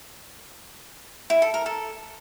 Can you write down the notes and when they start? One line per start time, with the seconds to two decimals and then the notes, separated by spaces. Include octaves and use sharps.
1.30 E4
1.42 A4
1.54 A#4
1.66 A4